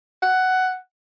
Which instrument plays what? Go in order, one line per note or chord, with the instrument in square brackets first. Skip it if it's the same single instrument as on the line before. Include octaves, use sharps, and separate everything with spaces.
[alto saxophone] F#5